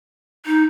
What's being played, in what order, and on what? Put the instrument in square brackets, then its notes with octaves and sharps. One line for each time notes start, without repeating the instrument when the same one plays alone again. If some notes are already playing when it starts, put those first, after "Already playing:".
[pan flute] D#4